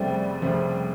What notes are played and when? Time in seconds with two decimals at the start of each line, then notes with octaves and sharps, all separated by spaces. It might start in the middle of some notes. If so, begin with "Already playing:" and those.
Already playing: F1 F2 C#3 F3 G3 A3
0.42 F1 F2 C#3 F3 A3